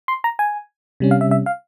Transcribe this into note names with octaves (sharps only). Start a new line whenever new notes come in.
C6
A#5
G#5
C3 G3 C#4
F5
E5
E5
F5